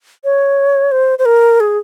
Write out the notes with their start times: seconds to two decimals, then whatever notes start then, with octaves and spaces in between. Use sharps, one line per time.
0.24 C#5
0.91 C5
1.19 C5
1.25 A#4
1.60 G#4